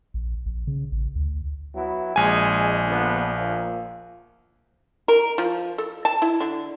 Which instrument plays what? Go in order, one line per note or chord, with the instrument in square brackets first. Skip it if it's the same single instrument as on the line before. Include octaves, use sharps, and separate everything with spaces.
[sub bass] A#1
A#1
C#3
A1
D2
[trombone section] F#3 B3 E4
[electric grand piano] A#1 G#5 [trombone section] G#3
[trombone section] D3 F3 B3
F3 A#3
[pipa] A#4
F3
A4
A5
E4
D3